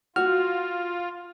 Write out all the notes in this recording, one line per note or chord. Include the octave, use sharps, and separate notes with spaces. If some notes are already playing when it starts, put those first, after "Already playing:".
F4 F#4 F6